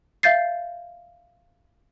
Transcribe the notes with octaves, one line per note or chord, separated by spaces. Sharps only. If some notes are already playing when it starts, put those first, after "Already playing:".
E5 F5 G6 A6 C7